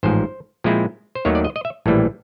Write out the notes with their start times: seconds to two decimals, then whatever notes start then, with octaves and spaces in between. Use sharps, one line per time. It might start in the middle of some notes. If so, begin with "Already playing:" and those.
0.03 A1 G#2 F3 C5
0.64 A#2 F3 G#3 C4 E4
1.15 C5
1.25 D#2 D#3 F#3 A3 C#5
1.35 D5
1.44 D#5
1.56 D#5
1.65 E5
1.86 A#1 A2 E3 G3